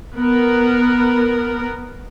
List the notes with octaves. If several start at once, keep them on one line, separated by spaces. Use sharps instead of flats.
B3 A#4